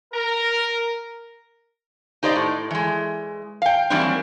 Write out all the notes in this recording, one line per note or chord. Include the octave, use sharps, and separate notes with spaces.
A#4
D#4 G4 C5 D5 D#5
A2
E3 G#3
F5 G5
E3 F#3 G3 A#3 C4 D4